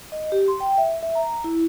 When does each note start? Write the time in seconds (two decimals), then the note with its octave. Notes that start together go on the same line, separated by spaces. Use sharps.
0.12 D#5
0.32 G4
0.48 C6
0.60 G5
0.78 E5
1.03 E5
1.15 A#5
1.44 E4